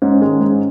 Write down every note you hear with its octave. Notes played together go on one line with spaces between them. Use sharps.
G#2 C#4
D#3 G#3
G#2